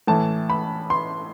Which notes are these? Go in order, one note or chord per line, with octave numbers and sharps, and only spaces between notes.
A2 E3 A5
B5
C6